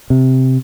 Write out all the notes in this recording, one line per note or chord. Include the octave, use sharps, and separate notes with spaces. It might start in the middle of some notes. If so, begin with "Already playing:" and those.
C3